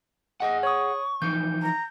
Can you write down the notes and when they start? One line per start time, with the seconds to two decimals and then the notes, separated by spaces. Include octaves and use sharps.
0.40 G#4 D#5 F#5
0.63 C#5 C#6 D#6
1.22 E3 F3 D#4 G6
1.62 A#5